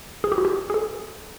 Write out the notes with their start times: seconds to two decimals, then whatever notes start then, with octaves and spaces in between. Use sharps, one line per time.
0.24 G#4
0.32 G4
0.38 F#4
0.45 G4
0.70 G#4
0.74 A4